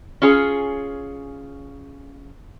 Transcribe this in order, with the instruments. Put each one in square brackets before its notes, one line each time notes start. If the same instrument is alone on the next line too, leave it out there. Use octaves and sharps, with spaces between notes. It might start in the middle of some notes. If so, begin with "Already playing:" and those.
[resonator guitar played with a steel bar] C#4 F4 G#4 C#5